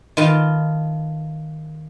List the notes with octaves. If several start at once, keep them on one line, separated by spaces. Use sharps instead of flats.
D#3 F4 B4 A5